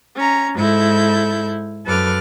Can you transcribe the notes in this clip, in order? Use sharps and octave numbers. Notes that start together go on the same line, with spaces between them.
C#4 A#5
G#2 E4 A4 G6
F#2 A4 B4 D6 F6